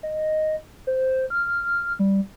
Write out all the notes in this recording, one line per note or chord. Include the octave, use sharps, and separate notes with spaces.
D#5
C5
F6
G3